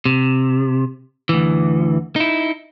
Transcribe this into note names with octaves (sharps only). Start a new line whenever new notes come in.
C3
D2 E3
D#4 E4